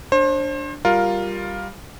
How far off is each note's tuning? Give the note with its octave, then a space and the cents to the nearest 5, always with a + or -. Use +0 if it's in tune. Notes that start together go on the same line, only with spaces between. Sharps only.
D4 +0 C5 +35
G3 +0 F4 +10 A#4 +0